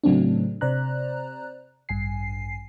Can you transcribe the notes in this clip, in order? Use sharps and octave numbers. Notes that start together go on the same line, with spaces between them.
A2 C#3 F#3 A3 C4 D4
C3 C5 D5 A#5 F#6
A1 G2 G#5 C7